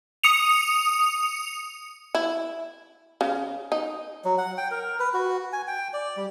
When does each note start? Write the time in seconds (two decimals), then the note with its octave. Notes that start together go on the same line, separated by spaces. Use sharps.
0.23 D#6 C#7 F7
2.15 E4
3.21 C#3
3.72 D#4
4.25 F#3
4.38 F#5
4.58 G5
4.71 A#4
5.00 B4
5.14 F#4
5.53 G#5
5.67 G5
5.93 D5
6.17 G3